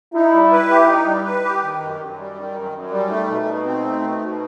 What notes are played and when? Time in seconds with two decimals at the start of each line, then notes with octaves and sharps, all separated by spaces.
0.14 D#4 E4
0.32 G3
0.52 B4
0.69 G4
0.88 D#4
1.06 G3
1.25 B4
1.44 G4
1.63 D#3
1.80 F#2
1.99 F#2
2.18 G3
2.35 D#3
2.54 F#2
2.72 F#2
2.91 G3
3.10 A3 D#4
3.27 B2
3.46 B2
3.66 C4
3.84 A3
4.02 B2
4.20 B2